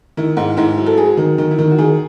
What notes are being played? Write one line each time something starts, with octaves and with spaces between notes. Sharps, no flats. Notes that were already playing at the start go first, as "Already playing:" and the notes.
D#3 E4
G#2
G#2 E4
F#3
A4
F#3 G#4
D#3
D#3
E4
D#3
F#4
D#3 G#4